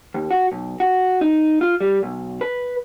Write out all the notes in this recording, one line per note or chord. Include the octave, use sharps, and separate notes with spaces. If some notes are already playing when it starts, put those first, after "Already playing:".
D#2
F#4
B1
F#4
D#4
F4
G3
B1
B4